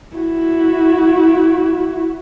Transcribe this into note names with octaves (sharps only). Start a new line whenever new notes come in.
E4 F#4